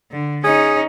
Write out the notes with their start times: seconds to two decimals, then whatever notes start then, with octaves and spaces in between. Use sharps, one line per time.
0.11 D3
0.44 C#4 D#4 G#4